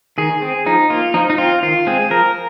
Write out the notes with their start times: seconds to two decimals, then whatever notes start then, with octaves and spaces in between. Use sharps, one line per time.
0.18 D#3 G#4
0.42 C4
0.66 F3 D#4
0.90 A#3 F4
1.14 F3 D#4
1.30 D#4
1.38 C4 F4
1.63 D#3 F4
1.87 G#3 C4 G#4
2.11 F3 A#4